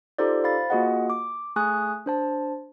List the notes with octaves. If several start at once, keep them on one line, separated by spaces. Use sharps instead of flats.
D#4 F4 G4 A4 C5 D5
C5 F5 B5 A6
A#3 F4 F#4 G#4 D#5 F#5
D6
A3 G#4 G#5 C#6 D#6 F#6
D4 C5 A5